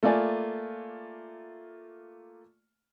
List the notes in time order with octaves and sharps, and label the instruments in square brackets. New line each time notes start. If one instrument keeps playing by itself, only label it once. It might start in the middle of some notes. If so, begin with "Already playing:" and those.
[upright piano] A3 A#3 F4 D5 G#5